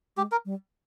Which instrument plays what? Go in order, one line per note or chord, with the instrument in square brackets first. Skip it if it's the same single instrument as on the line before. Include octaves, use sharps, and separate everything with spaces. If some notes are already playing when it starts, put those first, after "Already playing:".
[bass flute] G#3 [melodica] G4
[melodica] A#4
[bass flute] G3